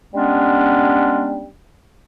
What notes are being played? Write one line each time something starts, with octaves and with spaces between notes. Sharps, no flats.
G3 G#3 B3 C#4 D4